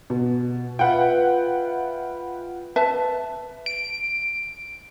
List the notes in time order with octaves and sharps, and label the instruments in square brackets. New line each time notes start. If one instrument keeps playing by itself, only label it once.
[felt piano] B2
[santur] F4 B4 E5 [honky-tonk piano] F#5 G5
[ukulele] B4 E5 A5
[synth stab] D7